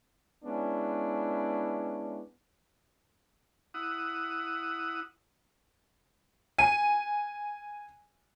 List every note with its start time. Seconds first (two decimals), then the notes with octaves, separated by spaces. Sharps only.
0.45 G#3 B3 C#4 D4 E4
3.74 E4 F#5 D#6
6.58 G#5 D#7